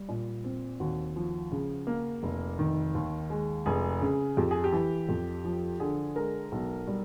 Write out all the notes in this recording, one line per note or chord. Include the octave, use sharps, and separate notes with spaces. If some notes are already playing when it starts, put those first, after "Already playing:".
Already playing: G3
A#2
C4
D#2 F#4
F3
C#3
A#3
F1
D#3
D#2
G#3
F1 G#4
C#3
F2 G4
G#4
G4
E3
F2
F3
D3 G#4
G#3 A#4
B1
G3